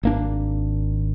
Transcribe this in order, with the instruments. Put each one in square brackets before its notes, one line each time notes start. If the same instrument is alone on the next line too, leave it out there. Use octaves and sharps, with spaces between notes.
[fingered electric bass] G#1 A#3 D4